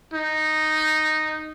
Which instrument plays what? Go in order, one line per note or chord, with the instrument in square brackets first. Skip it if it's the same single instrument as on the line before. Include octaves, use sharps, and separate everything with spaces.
[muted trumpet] D#4